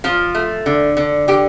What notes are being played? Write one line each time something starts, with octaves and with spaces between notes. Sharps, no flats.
F3 F4
A3
D3
D3
D3 G4